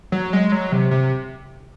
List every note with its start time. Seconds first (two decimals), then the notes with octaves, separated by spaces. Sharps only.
0.12 F#3
0.33 G#3
0.52 F#3
0.72 C3
0.91 C3